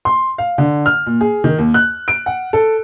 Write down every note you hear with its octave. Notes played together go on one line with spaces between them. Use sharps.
C6
F5
D3
F6
A#2
G#4
D#3
D#2
F#6
D7
F#5
A4